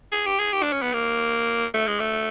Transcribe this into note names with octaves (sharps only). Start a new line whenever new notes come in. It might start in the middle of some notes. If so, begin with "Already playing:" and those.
G#4
G4
G#4
G4
D4
C#4
B3
A#3
A3
G#3
A3